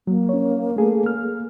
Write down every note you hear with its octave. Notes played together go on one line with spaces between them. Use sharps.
F#3 A#3
C#4 C#5
A3 G#4 A4
F6